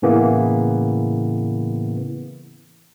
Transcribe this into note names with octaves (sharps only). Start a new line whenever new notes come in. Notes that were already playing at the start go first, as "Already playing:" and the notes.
A2 C#3 E3 A#3 B3